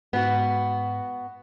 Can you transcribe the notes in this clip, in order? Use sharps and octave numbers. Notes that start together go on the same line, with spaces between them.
G#2 B3 F#4